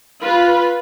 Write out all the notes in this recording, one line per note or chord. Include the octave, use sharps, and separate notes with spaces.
F4 B4